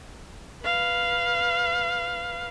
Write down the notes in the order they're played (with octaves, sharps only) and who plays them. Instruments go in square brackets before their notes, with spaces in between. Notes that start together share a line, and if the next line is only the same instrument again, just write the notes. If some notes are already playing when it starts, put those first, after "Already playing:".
[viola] B4 F5